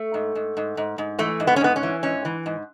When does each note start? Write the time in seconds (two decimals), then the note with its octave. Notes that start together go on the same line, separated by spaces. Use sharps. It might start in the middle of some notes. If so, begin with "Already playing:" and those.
Already playing: A3
0.14 G#2
0.35 G#2
0.57 G#2
0.77 G#2
0.98 G#2
1.19 E3 A3
1.40 G#2
1.47 B3
1.56 C#4
1.61 G#2 B3
1.76 C#4
1.83 E3
2.03 G#2 C#4
2.25 E3
2.46 G#2